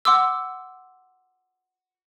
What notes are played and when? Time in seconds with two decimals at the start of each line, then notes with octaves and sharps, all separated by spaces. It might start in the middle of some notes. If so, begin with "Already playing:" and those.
0.05 F#5 C6 D6 E6